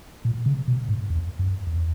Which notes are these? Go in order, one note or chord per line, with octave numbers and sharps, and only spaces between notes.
A#2
C#3
B2
G#2
E2
F#2
E2